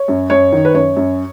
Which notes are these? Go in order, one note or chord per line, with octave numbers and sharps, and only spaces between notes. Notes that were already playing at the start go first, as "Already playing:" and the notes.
Already playing: C#5
F#2
F#2 C#5
D#3
B4
F#2 C#5
F#2